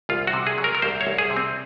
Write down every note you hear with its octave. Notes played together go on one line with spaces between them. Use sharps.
C2 F4
F#4
C3
G#4
F#3
A#4
A#4
C2 C5
C#5
C2
G#4
C3
C4